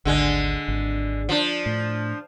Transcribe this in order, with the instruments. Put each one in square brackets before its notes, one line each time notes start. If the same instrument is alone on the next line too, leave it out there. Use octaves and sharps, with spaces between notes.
[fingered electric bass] G#1 D2 [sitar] D3 G#3
[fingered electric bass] G#1
[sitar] F3 D4
[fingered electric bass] A2